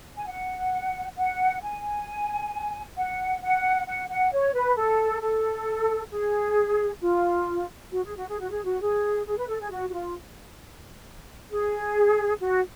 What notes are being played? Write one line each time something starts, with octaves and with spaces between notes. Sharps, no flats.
G#5
F#5
F#5
G#5
F#5
F#5
F#5
F#5
C#5
B4
A4
A4
G#4
F4
F#4
G#4
F#4
G#4
F#4
G#4
F#4
G#4
G#4
B4
A4
G#4
F#4
F#4
F4
G#4
F#4